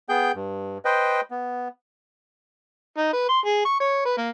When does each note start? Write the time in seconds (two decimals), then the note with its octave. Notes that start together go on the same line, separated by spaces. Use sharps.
0.09 B3 G#4 G5 G6
0.35 G2
0.85 B4 C5 D#5 G5
1.31 B3
2.98 D#4
3.13 B4
3.29 C6
3.45 G#4
3.65 C#6
3.80 C#5
4.05 B4
4.17 A#3